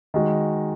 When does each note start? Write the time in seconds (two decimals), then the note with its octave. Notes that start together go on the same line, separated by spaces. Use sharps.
0.14 D#3 G#3 F#4